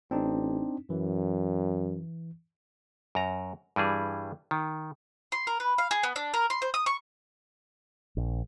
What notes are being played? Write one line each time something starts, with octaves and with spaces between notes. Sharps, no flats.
A1 C4 D4 D#4
F#2 E3
F#2 A#5
G2 E3 G3 G#4
D#3
C6
A#4
B4
F5
G#4
B3
D4
A#4
C6
C5
D#6
C#6
A#1